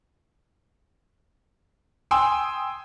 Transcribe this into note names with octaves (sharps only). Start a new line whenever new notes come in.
G5 G#5 C6 D#6 E6